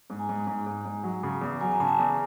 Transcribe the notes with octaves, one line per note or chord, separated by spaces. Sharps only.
G#2
G#5 A#5
G#2
G#2
G#2
G#2
F#3
C#3
E2
F#3 G#5 A#5
G#5
C#3 A5
G#5 A#5
E2